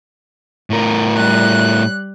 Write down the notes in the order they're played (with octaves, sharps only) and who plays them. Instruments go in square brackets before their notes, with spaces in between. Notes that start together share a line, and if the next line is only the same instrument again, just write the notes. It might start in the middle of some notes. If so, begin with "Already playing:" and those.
[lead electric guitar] A2 A#4
[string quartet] G3 F#6